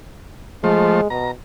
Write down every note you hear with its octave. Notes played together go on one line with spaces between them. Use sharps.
F3 G#3 A3 C5
B2 A#5